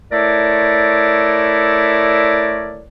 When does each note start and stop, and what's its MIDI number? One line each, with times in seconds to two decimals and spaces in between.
0.11 2.86 57
0.11 2.86 64
0.11 2.86 69
0.11 2.86 70
0.11 2.86 73
0.11 2.86 74